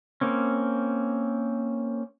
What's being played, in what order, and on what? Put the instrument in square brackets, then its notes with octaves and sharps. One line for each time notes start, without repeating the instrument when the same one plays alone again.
[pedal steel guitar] A#3 C4 C#4